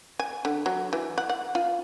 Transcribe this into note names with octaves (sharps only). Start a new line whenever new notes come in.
G#5
D3
F#3
E3
F#5
F#5
F4